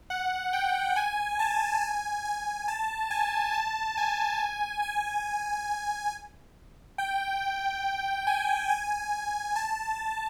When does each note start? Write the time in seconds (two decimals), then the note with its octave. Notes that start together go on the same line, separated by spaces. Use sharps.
0.10 F#5
0.53 G5
0.96 G#5
1.39 A5
1.81 G#5
2.25 G#5
2.68 A5
3.10 G#5
3.53 A5
3.97 G#5
4.82 G#5
6.98 G5
8.27 G#5
8.69 G#5
9.56 A5